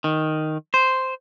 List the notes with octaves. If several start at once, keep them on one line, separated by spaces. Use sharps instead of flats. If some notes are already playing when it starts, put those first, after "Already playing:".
D#3
C5